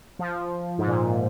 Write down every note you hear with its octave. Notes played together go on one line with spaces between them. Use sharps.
F3
G#2
A#2